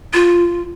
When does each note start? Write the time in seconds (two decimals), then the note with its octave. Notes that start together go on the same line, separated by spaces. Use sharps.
0.14 F4